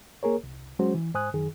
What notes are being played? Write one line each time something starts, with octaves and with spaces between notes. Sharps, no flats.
A#3 G#4 A#4 C#5
C2
F#3 G#3 C#4 F#4 C5
E3
G#2 C5 G#5 D#6 F#6
F#2 D#3 G#4